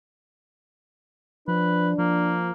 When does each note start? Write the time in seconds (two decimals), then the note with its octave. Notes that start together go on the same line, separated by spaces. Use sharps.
1.48 F3 D4 B4
1.98 F3 A#3